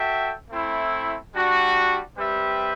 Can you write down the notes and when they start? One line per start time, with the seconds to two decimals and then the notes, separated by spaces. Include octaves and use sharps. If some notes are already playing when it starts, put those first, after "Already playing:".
Already playing: F#4 A4 E5 G5
0.51 A3 C4 E4
1.33 G3 D4 F#4
2.17 G3 C4 G4 B4 E5